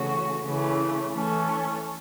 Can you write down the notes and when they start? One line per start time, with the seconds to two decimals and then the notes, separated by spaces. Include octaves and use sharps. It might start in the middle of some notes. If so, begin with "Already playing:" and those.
Already playing: C#3 E3 A3 C#4 F#4
0.44 C#3 E3 A3
1.13 E3 A3 C#4 A4 C#5